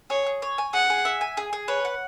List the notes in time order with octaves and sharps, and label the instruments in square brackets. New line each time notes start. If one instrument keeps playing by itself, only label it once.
[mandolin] G#4 [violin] C#5
[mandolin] G#4
C#5
G#5
[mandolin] G#4 [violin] F#5
[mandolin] G#4
E5
G#5
G#4
G#4
[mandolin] B4 [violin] C#5
[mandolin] F#5